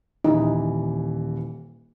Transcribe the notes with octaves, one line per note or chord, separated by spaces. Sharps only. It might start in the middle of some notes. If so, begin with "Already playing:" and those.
D#1 E3 D#4